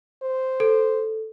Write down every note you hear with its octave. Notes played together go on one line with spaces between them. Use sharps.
C5
A4